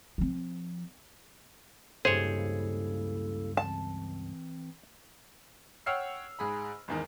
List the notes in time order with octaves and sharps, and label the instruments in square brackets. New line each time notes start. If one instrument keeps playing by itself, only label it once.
[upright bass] F3 C4
[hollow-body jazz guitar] C#2 G2 [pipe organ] A#3 E4 A4 [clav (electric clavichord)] G#4 C#5 [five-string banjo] C5
[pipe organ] E3 C4 [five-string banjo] A5
[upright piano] C#5 F#5 G5 E6 F6 C7
G#2 G#4 B5
G#1 E2 D#3